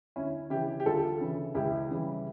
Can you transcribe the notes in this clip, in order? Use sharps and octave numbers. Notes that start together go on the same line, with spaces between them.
D2 C#4 E4
C#3 E3 E4 G4
G4
D2 F4 A4
C#3 E3
C#2 E4 G4
C#3 E3 G3